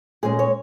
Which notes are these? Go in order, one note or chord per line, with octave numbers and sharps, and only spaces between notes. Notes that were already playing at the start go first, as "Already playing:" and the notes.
A#2 G#3 C#4 G#4
C#5